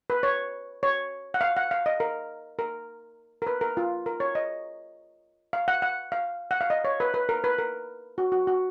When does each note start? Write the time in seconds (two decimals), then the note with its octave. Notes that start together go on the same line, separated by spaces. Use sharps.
0.10 B4
0.23 C#5
0.83 C#5
1.34 F#5
1.41 F5
1.57 F#5
1.71 F5
1.86 D#5
2.00 A#4
2.59 A#4
3.42 A#4
3.47 B4
3.61 A#4
3.77 F4
4.06 A#4
4.20 C#5
4.35 D#5
5.53 F5
5.68 F#5
5.82 F#5
6.12 F5
6.51 F#5
6.61 F5
6.70 D#5
6.85 C#5
7.00 B4
7.14 B4
7.29 A#4
7.44 B4
7.58 A#4
8.18 F#4
8.32 F#4
8.47 F#4